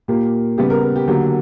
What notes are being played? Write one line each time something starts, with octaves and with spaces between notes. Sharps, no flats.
A#2 A#3 G4
C#3 G3 B3 G4
A#4
A#4
G4
D3 F#3 A#3 G4